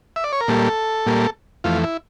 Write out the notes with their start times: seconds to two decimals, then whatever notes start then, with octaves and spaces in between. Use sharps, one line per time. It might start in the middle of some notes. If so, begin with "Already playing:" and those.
0.16 E5
0.24 D5
0.33 C#5
0.41 A#4
0.48 A#2 G3 A#3 A4
1.06 A#2 G3 A#3
1.64 F2 E3 A3 F4
1.84 E4